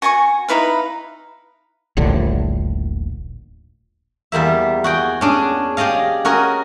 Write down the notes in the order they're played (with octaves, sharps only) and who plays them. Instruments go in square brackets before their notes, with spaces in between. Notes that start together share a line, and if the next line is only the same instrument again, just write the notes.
[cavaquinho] F#4 G#5 A5 C#6
D#4 E4 B4 F5
[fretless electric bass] D#1 A#1 A2 D3
[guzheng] E2 G3 A#3 E5
F#4 G#4 G5
C#4 D4 G#4
G4 G#4 D5 D#5 F5
C#4 F#4 A#4 D#5 G#5